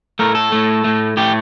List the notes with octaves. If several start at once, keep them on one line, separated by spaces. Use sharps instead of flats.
A2 A3 A#4
A4
A2 A3
A2 A3
A2 A3 G4